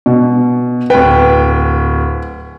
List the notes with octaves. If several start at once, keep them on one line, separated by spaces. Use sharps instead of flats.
B2
D1 B4 G5